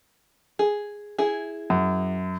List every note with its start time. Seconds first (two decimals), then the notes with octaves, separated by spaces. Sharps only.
0.59 G#4
1.18 E4 G#4
1.70 F#2